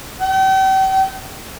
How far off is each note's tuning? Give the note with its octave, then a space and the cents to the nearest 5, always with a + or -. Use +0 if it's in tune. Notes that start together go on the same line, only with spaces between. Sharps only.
G5 -40